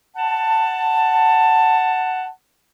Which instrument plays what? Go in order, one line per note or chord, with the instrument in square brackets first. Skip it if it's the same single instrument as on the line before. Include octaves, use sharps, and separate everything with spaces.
[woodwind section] F#5 A5